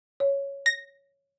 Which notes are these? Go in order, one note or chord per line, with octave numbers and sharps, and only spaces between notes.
C#5
A#6